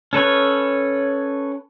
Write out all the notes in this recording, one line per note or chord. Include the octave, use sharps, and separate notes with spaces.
C#4 A4 B4 C#5